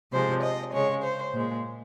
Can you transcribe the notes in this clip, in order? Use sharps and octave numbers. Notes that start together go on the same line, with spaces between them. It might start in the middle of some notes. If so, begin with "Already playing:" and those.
C3 F3 G#3 C5
D#5
C#3 G#3 C#5
C5
A#2 G#3